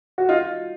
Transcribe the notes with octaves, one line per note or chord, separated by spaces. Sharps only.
F#4
D#4 F4